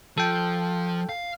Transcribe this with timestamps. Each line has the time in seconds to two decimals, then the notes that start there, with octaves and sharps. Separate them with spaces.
0.18 F3 A4 G5
1.09 F5